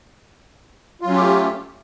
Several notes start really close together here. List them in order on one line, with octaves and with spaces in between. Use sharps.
F4 F#3 C#4 G4 A3